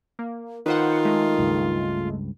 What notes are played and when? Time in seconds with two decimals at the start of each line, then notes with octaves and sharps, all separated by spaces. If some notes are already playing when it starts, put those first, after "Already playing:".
0.19 A#3
0.66 D#3 F4 B4 C5 F#5
1.05 G#3 A3
1.38 C#2 G2